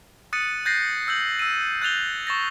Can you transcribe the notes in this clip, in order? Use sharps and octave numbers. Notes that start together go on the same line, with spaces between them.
D#6 F#6 A6 C#7 D#7
F#6 G6 A6 A#6 C7
E6 G6 F#7
E6 D#7
F#6 G6 A6 F7 G7
C#6 A6 A#6